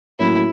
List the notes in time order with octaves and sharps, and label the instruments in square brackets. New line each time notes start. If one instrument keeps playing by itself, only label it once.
[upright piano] A2 F#3 A#3 C#4 [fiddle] E4